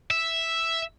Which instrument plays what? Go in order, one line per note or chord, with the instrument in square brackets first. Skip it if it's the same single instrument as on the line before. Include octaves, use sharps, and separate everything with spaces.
[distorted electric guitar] E5